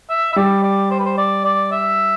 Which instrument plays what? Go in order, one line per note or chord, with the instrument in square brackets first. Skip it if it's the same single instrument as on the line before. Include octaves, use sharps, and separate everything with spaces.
[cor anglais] E5
E5
[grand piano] G3 [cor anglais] D5
[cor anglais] D5
C5
B4
C5
D5
D5
E5